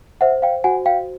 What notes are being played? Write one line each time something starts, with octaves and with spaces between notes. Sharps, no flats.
C5 E5 F#5
F5 G5
F#4 F#5 G#5
F5 G5